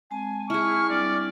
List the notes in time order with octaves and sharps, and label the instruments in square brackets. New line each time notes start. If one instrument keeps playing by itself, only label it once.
[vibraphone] G#3 C4 A5 [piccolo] G#5
[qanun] E4 G#4 [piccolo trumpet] C#6 [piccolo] F6
[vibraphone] G3 C4 D4 [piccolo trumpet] D5